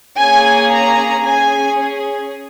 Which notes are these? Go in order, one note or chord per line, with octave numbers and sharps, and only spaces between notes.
A#3 C#4 G#4 G#5
A#5
C#4 G#4 G#5